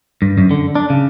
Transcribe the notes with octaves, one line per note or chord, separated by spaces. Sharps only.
G2
F#2
D3
D4
C#3